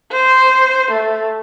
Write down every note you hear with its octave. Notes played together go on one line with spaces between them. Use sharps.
C5
A3